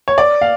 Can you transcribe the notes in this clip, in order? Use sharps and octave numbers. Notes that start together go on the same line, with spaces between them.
C#5
D5
F5